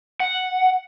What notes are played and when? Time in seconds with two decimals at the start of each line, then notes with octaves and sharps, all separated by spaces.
0.20 F#5